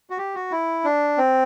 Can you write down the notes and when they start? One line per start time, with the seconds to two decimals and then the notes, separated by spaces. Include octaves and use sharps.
0.10 F#4
0.18 G4
0.35 F#4
0.51 E4
0.84 D4
1.18 C4